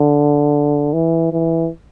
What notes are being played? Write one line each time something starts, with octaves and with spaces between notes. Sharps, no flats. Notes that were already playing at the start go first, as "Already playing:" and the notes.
Already playing: D3
E3
E3